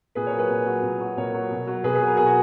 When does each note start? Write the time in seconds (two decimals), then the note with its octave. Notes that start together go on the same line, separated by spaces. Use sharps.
0.15 A#2 G#4 B4
0.27 A#4 C#5
0.33 F#3
0.39 G#4 B4
0.50 A#2
0.66 F#3
0.83 A#2
1.00 F#3
1.17 A#2 A#4 C#5
1.34 F#3
1.51 B2
1.67 F#3
1.84 B2 G#4 B4
1.95 G#4 B4
2.01 F#3
2.06 A#4
2.17 B2 G#4
2.26 F#4